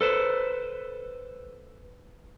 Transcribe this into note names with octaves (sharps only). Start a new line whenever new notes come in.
A4 B4 C5